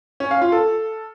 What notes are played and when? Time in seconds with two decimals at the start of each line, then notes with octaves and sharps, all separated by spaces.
0.20 C#4
0.31 F5
0.42 F4
0.52 A4